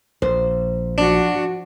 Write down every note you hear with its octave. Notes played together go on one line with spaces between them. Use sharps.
A#1 C5
F3 D4 F#4